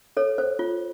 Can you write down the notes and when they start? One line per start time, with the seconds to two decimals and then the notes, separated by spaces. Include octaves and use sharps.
0.17 A4 C#5
0.38 C5
0.59 F4